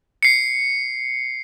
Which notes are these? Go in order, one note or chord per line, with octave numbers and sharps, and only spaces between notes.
C7 C#7